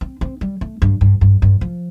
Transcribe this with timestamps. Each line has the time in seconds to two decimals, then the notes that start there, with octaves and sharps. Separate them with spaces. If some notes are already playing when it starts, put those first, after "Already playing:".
0.01 C4
0.21 C4
0.41 G3
0.61 A3
0.82 G2
1.01 G2
1.21 G2
1.42 G2
1.61 F3